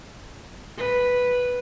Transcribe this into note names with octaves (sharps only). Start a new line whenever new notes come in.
B4